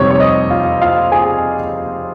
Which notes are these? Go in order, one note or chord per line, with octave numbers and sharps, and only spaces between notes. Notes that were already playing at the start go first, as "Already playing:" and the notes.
Already playing: F2 C3 G3 C4 D#4 C#5
C#5
D#5
F4 F5
F4 F5
G#4 G#5